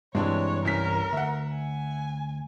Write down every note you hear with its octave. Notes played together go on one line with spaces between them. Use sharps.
G2 C3 E3 G#3 D4 C#5
C2 C#4 A#4 B6
D2 E5 F#5
G#5